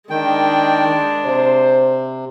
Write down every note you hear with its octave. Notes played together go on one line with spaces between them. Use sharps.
D#3 G#3 D4 G5
C3 C5